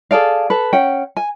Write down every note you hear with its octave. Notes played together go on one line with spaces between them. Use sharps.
G#4 A4 D5 F5
A4 B4
C#4 F#5 G5
G#5